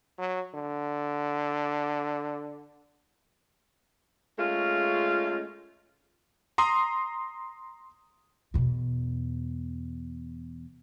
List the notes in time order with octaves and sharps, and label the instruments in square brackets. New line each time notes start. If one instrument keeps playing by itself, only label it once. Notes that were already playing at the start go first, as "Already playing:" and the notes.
[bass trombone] F#3
D3
[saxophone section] G#3 A3 C#4 F4
[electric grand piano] A#5 C6 D#6
[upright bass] E2 B2